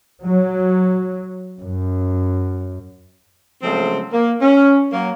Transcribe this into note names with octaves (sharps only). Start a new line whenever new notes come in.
F#3
F#2
C#3 F3 F#3 G#3 A3 C4
A#3
C#4
F#3 A#3